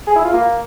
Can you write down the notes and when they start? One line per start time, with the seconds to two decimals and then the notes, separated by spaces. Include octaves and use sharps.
0.07 G#4
0.16 E4
0.24 F4
0.33 A#3